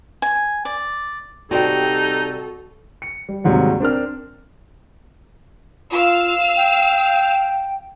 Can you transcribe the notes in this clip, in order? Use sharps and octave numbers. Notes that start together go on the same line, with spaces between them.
G#5
D5
C3 G3 C4 D#4 F#4 A4 G5
C#7
G3
D#2 G#2 C3 F#3 G3
C4 D4 A#4 F6
F4 F5 E6
G5